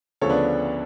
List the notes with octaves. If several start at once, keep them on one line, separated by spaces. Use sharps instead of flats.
D2 C#3 F3 A4 C#5
B3 D4